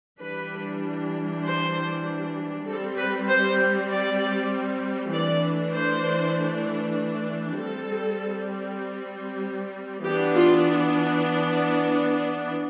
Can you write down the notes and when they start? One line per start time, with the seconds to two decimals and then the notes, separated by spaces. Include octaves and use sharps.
0.21 E3 G3 D4 B4
1.44 C5
2.67 G3 C4 A4
2.98 B4
3.28 C5
3.89 D5
5.13 E3 A3 D4 D5
5.74 C5
7.58 G3 C4 A4
10.04 E3 B3 D4 G4
10.35 F4